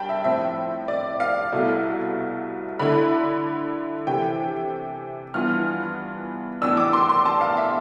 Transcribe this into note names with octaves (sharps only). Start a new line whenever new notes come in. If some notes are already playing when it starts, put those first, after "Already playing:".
Already playing: G2 G5 A5 B5
E5
A2 F3 C4 E5
D5
F5
C2 B2 A3 E4
D3 A3 E4 B5
C3 E3 A3 G5
G2 E3 B3 F4 F6
A2 E3 B3 D4 E6
D6
C6
C6
A5
F5
E5